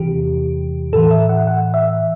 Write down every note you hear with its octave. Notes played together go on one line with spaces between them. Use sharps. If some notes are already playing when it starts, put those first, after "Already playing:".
Already playing: E2 C3 E3 G4
A2 E3 A4
E5
F#5
F#5
E5